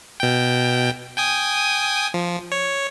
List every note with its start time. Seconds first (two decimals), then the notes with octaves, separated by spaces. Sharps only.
0.20 B2 G5
1.17 G5 G#5 D#6
2.14 F3
2.52 C#5